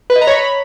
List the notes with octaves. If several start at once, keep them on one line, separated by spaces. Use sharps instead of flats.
B4
D#5
A#5
C#5
B5